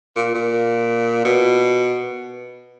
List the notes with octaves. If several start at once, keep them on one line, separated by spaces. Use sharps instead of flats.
A#2
A#2
B2